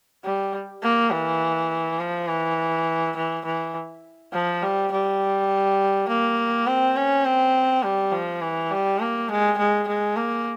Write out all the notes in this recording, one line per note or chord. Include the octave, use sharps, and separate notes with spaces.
G3
A#3
E3
F3
E3
E3
E3
F3
G3
G3
A#3
C4
C#4
C4
G3
F3
E3
G3
A#3
G#3
G#3
G#3
A#3